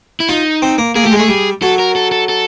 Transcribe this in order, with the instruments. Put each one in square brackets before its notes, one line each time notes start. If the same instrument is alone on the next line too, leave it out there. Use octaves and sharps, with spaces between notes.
[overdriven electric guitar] E4
[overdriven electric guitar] D#4 [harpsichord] F4
[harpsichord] C4
A#3
[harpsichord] A#3 [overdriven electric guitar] G#4
[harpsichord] A3 [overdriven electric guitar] G4
[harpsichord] G#3
[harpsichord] A3 [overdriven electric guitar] G#4
[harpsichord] G3
[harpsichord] F#3 [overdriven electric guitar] A4
[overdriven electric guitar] A#4
A4
A4
A4